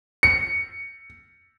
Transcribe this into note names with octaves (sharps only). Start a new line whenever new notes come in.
C#7